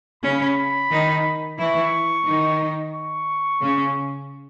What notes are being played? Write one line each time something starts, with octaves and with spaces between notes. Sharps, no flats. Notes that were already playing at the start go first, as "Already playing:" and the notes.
C#3 C#4 B5
D#3 D#4
E3 E4 C#6
D#3 D#4
C#6
C#3 C#4